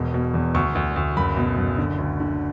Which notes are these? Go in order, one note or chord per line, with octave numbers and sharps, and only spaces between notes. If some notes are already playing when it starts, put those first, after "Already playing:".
Already playing: E1 B2
B2
E2
D2 C#6
D2
D2
F#1 B5
B2
F#1
D3
D2
D3